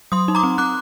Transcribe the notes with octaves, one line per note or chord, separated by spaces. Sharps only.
F#3 C6 D#6
D#4
A#5 D6
C4
C4 D6 F#6